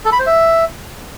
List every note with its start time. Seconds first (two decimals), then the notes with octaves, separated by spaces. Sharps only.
0.05 A4
0.12 B5
0.19 C5
0.26 E5